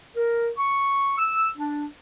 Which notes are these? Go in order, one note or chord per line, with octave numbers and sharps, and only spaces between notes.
A#4
C#6
E6
D4